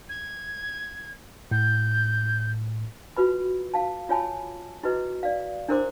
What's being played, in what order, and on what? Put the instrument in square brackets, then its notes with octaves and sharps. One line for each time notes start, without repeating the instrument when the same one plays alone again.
[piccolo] G#6
[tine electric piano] A2 [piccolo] G6
[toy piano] F4 F#4 B4 B5
F5 A5
F4 C#5 G#5 A5 B5
E4 F#4 G#4 B4 D#5
D5 F5
D4 E4 A#4 C5 C6 D6